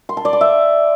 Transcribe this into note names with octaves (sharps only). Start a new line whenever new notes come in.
C6
A5
D5
D6
E5